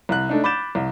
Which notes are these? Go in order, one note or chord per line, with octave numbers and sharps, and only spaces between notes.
C2 F#6
A3 D4 D#4
B5 D6 G6 A6 E7
C2